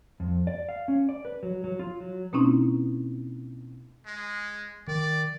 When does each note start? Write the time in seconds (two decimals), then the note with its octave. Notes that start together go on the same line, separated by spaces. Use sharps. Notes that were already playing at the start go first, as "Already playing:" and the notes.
0.20 F2
0.47 D5
0.69 F5
0.88 C#4
1.09 D5
1.25 B4
1.43 F#3
1.64 F#3
1.79 F4
2.00 F#3
2.33 B2 A#3 C4 C#4 D#4 E4
4.06 G#3
4.88 D#3 D5